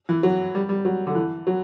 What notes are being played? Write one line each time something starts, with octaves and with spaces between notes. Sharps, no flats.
E3
F#3
G3
G3
F#3
D3
E3
F#3